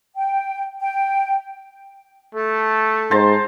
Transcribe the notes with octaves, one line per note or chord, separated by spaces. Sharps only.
G5
G5
A3 A4
G#2 C5 A5 A#5